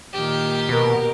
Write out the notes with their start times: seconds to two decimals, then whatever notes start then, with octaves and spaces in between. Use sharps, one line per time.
0.13 A#2 D#3 G4
0.69 B2 A#4